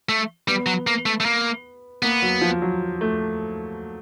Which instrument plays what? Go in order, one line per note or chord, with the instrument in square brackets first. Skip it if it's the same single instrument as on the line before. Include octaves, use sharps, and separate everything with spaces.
[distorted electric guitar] A3
[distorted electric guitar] G3 [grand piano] B3
[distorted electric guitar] F#3
A#3
A3
A3
A#3
[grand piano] A#3 [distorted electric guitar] B3
[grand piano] F#3
F3
F#3
A3